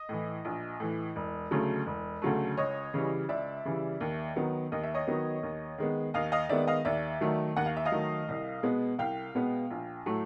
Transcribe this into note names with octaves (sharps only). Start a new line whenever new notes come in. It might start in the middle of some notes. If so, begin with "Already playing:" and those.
Already playing: D#5
A2 E3
A#1
A2 E3
E1
D2 C#3 F#3 A3
E1
D2 C#3 F#3 A3
C#2 C#5 D#5
C#3 E3 G3
C#2 D5 E5
C#3 E3 G3
D#2
D#3 F#3 B3
D#2 D#5
E5
C#5 D#5
D#3 F#3 B3
D#2
D#3 G#3 B3
D#2 D#5 F5
D#5 F5
D#3 G#3 B3 D5 E5
D#5 F5
D#2 D5 E5
D#3 F#3 A3
D#2 F#5
F5
E5
D#5 F5
D#3 F#3 A3
C2
B2 G#3 B3
C2 F5 G5
B2 G#3 B3
A#1
A2 F#3 A3